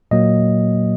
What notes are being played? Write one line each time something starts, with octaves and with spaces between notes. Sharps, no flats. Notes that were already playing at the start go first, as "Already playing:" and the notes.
A#2 F#3 A#3 D#5